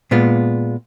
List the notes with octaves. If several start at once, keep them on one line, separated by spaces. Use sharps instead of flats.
A#2 G#3 B3 F4